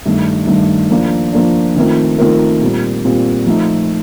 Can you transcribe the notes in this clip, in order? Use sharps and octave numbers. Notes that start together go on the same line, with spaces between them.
G2 D#3 A3
G2 D#3 A3
F3 A#3 D4
F3 A#3 D4
D#3 A3 C4 F4 A#4
D#3 A3 C4 F4 A#4
A#2 G3 C4
A#2 G3 C4
F3 A3 D#4